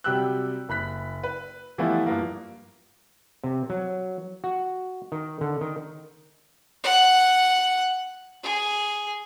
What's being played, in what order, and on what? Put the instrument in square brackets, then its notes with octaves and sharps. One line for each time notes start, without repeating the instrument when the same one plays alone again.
[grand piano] C3 F#3 G3 G5 E6 F#6
F#1 B5 F#6 B6
B4
E3 F3 G3 A3 B3 E4
G2 F3 A#3
[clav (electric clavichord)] C3
F#3
F#4
D#3
D3
D#3
[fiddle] F#5
G#4